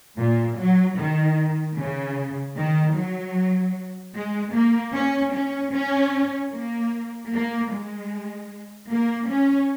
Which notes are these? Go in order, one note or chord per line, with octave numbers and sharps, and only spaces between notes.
A#2
F#3
D#3
C#3
D#3
F#3
G#3
A#3
C#4
C#4
C#4
A#3
A#3
G#3
A#3
C#4